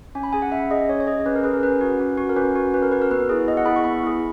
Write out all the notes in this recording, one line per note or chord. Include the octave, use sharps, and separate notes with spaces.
C#4 G#5
B5
G#4 G#5
F#5
C#4 E5
G#4 D#5
C#4 C#5
C#5
G#4 D#5
C#4 B4
A#4
G#4 B4
A#4
C#4 B4
F#4
C#4
F#4
A#4
C#4 B4
F#4
C#4 B4
A#4
F#4 B4
A#4
B3 B4
E4 G#4
B3 D#5
F#5
E4 G#4 B5
C#6
B3 B5
E4 G#4